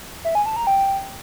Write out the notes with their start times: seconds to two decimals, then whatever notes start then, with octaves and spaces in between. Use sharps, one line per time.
0.25 E5
0.35 G#5
0.46 A5
0.56 A#5
0.67 G5